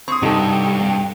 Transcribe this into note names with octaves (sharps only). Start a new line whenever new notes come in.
C4 C#6 D#6
G2 C3 D#4 F#4 A4